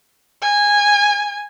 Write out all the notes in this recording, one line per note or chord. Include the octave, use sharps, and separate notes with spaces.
G#5